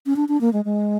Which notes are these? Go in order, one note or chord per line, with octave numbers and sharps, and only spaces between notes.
C#4
D4
D4
A#3
G#3
G#3